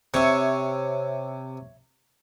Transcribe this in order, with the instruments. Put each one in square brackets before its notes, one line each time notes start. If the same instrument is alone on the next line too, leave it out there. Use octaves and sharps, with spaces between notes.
[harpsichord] C3 [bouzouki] C#5 E5